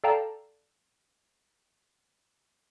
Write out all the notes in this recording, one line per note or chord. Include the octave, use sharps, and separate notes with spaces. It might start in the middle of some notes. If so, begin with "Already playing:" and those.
A4 D5 F5 G5 A5 A#5